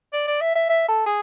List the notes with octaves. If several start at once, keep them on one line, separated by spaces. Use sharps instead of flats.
D5
D5
E5
E5
E5
A4
G#4